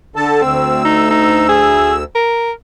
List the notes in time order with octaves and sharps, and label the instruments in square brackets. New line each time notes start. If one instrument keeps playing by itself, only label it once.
[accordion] D3 A4 A5
[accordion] D2 E6 [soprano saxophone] C4
[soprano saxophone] D#4
D#4
G#4
A#4